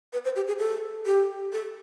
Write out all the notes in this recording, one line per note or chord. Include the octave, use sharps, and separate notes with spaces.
B4
C5
G4
G#4
A4
G4
A4